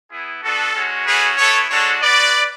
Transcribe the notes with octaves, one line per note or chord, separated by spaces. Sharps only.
B3 E4 G#4
B3 D4 F#4 A4
G#3 C#4 F#4
A3 C#4 F#4 G#4 B4
B3 E4 A4 C#5
G#3 D4 F#4 A4 C#5
B3 F#4 B4 D5